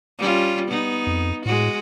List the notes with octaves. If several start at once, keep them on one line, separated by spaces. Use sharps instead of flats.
G3 C#4 F4
B3 D#4
F2
A2 G#3 F#4